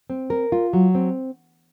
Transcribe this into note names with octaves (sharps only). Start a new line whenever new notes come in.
C4
A#4
F4
F#3
C4